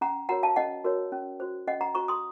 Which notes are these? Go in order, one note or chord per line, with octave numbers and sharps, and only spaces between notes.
C#4 F#5 A#5
F#4 A#4 C#5 F#5 A#5
F5 A5
C#4 D#5 F#5
F#4 A#4 C#5
C#4
F#4 C5
C#4 D#5 F#5
F#5 A#5
F#4 C5 A#5 C#6
C6 D#6